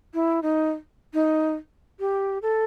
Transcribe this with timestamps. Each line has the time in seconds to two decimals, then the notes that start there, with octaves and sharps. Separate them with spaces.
0.14 E4
0.43 D#4
1.14 D#4
2.00 G4
2.42 A4